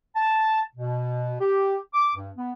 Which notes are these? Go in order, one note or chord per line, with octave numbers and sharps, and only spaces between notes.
A5
B2
G4
D6
G2
B3